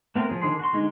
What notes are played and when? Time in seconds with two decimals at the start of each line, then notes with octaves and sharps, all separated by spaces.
0.16 A3 B3 C4 A#4
0.29 F3 G#4
0.42 D3 D#3 D4 G#4 C6
0.59 F#4 C6
0.73 D3 G#3 D#4